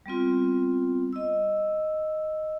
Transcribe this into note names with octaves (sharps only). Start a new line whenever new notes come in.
G3 B3 C4 F4
D#5 E6